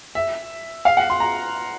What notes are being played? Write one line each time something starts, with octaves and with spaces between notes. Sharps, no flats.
E5
F5
F#5
C6
A#5